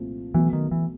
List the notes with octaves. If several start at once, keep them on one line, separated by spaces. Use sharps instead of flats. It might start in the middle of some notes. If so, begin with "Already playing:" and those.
Already playing: C2 A#2 F3 A3
B1 B2 E3 F#3 A3
D#3
E3